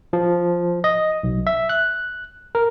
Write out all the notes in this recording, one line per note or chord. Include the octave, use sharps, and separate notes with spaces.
F3
D#5
B1
E5
F#6
A#4